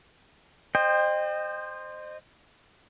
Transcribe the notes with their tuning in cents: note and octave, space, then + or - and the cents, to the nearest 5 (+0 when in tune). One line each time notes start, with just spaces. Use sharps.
C5 +0 D#5 -30 G5 +25